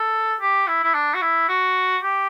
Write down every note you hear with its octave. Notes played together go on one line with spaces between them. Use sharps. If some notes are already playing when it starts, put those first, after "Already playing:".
Already playing: A4
G4
E4
E4
D4
F#4
E4
F#4
G4